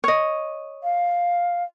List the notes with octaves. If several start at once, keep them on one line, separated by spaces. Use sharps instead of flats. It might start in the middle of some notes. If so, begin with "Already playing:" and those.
C#5 D#5
F5